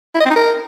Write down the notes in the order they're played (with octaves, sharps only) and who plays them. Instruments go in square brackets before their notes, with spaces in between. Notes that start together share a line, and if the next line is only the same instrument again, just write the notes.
[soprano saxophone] E4
D#5
C4
D#4
A#4